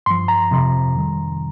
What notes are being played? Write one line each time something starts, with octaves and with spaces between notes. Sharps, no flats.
G2 F3 C6
A#5
F2 C3 F3
F2 D#3 G3